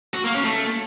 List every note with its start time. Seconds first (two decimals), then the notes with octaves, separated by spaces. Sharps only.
0.14 F#4
0.24 A#3
0.34 C#4
0.44 A3